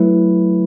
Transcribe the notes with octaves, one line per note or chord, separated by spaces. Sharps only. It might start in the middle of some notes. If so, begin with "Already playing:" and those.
Already playing: F#3 A3 E4 B4